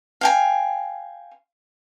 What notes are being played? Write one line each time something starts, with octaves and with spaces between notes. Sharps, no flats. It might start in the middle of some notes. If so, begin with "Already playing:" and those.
F5 G5 G#5